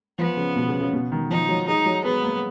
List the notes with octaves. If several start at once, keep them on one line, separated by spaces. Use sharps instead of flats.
F3 B3
C#3
B2
C#3
C#3
B2
D#3
F3 D#4
F#3
G#3 D#4
F#3
G#3 B3
A#3